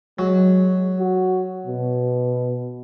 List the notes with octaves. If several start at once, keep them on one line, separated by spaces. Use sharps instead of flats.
F#3 G#3
F#4
B2